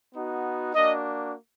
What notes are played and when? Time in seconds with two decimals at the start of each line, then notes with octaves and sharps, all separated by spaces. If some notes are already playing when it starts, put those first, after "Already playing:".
0.12 B3 D#4 F#4
0.74 A#3 D4 F#4 D#5